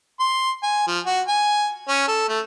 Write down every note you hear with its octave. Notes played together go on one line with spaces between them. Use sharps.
C6
G#5
F3
F#4
G#5
C#4
A4
A3